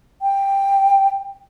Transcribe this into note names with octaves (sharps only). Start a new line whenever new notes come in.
G5